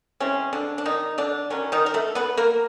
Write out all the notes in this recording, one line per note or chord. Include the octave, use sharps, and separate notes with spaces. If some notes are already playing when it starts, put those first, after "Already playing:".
E3 G#3 C4 C#4
D3 D4
D4
D#3 D#4
D3 D4
D#3 F#3 B3 C#4
D#3 D#4
A#4
A3 A4
B3 B4
A#3 A#4